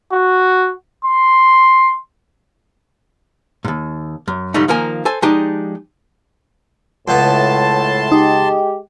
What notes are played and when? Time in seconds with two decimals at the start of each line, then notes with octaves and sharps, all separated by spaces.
0.13 F#4
1.05 C6
3.65 D#2 G#2
4.28 F#2
4.54 G#2 D3 F3 G3 A3 D#4
4.68 D#3 F3 A#3 A#4 G#5
5.05 A4 C5 G#5
5.22 F3 G#3 D4 D#4 G4
7.08 C#2 A2 B3 A5 C6
8.12 G#3 D#4 G4